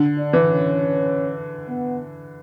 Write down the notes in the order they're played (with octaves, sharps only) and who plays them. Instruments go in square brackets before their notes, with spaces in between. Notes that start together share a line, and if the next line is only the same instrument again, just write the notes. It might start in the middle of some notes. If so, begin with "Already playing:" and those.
Already playing: [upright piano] D3
[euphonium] D4
[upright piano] E3
[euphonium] C#4
B3